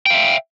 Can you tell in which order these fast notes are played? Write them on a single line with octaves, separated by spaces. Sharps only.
G5 F5 E5